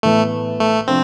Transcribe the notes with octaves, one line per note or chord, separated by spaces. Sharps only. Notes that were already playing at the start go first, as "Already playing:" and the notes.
A2 E3 A3 B3
A3
C3 F3 C4 D4 F4